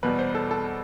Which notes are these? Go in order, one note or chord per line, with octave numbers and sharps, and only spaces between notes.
E2 B2 G3 B4
C5
A4
A4